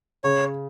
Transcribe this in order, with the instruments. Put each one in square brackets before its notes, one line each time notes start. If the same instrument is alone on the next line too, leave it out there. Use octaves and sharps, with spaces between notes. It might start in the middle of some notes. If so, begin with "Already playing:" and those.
[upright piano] C#3 [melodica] C#5